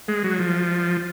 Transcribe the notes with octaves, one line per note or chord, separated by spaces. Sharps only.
G#3
F#3
F3